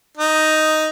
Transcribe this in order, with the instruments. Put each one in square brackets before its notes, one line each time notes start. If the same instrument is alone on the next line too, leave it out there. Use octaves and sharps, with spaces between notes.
[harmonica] D#4